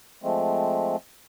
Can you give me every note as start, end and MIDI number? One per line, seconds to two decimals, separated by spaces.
0.23 0.96 53
0.23 0.96 56
0.23 0.96 57
0.23 0.96 60